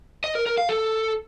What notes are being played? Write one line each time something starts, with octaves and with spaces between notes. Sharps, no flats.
D#5
A#4
A#4
F5
A4